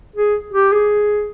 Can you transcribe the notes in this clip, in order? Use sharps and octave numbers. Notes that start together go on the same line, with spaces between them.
G#4
G4
G#4